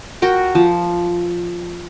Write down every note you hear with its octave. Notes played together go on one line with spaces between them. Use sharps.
F#4 A#4 G5
F3